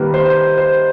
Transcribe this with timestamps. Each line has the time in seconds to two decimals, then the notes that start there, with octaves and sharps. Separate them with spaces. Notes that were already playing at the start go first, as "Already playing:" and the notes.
Already playing: D#3 G3 A#3 B4
0.14 C5
0.57 C5